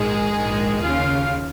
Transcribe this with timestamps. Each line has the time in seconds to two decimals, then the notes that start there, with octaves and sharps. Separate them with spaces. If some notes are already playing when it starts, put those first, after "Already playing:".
Already playing: A#1 G#2 D#3 G#3 G#4
0.36 A#1 G#2 D#3
0.83 D#2 C#3 F4 F5